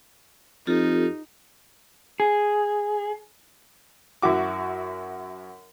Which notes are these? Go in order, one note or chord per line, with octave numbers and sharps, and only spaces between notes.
F2 D#4 F4 G4 A4
G#4
F#2 E4 F#4 D6